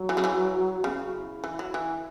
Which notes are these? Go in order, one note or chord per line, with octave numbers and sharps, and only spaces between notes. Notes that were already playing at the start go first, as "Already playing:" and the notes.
Already playing: F#3
E3
C#3
E3
C#3 B3
E4
F#4
E4
E3
F#3
E3